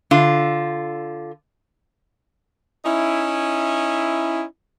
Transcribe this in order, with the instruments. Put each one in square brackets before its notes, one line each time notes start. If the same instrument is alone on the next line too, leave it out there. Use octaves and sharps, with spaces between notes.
[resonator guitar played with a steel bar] D3 F4
[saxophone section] C#4 D#4 E4